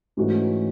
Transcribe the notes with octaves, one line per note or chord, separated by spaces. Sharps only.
G#2 E3 A3 C#4 F#4